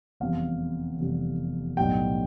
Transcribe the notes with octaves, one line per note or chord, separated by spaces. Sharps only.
F1 E2 C3 G3 F5
F1 E2 C3 G3
B1 A2 G3 G5